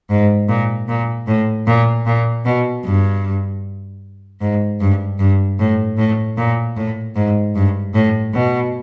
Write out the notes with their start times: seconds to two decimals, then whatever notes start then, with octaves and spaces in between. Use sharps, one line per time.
0.10 G#2
0.49 A#2
0.88 A#2
1.27 A2
1.67 A#2
2.06 A#2
2.45 B2
2.84 G2
4.41 G#2
4.80 G2
5.19 G2
5.59 A2
5.98 A2
6.37 A#2
6.76 A2
7.15 G#2
7.55 G2
7.94 A2
8.33 B2